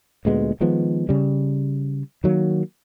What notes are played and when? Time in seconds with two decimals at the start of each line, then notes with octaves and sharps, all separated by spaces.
0.25 D2 A#2 G#3 B3
0.60 D#3 F3 G#3 B3
1.09 C#3 G3
2.24 D#3 F#3 A#3